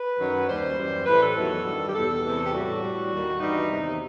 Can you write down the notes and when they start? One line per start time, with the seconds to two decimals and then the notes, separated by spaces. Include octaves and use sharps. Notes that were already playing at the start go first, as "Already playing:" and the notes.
Already playing: B4
0.19 F#2 D#3 F#3
0.48 D#2 D#3 G3 C5
0.77 F#2 E3 G3
1.06 A2 E3 G3 B4
1.21 A4
1.36 E2 D#3 F#3
1.65 G2 D#3 G3
1.88 G4
1.94 E2 B2 G3 A4
2.23 E2 C3 E3
2.44 G4
2.52 A2 G3 F#4
2.82 A2 G3
3.11 D#2 D#3 G3
3.40 G2 E3 G3 D#4
3.69 E2 C3 D#3